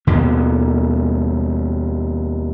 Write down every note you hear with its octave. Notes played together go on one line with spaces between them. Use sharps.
D#2 B2 D#3